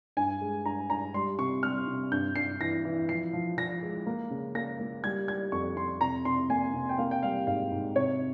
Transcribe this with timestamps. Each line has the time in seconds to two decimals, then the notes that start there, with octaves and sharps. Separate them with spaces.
0.17 G2 G#5
0.41 G#3
0.65 G2 A#5
0.90 G2 A#5
1.14 G3 C6
1.39 C3 C#6
1.63 G3 F6
1.87 C3
2.11 G2 G6
2.36 G2 C7
2.60 E3 A#6
2.85 E3
3.09 F3 C7
3.33 F3
3.58 F3 A#6
3.82 G#3
4.06 A#3
4.31 C#3
4.55 A#3 A#6
4.80 A#3
5.04 G3 G#6
5.28 G3 G#6
5.52 F2 C#6
5.76 F2 C6
6.01 C3 A#5
6.25 C3 C6
6.50 A#3 G#5
6.74 C3
6.89 G5
6.98 A#3 F5
7.11 G5
7.23 G3 F5
7.47 G#2 F5
7.72 G#2
7.96 C3 C#5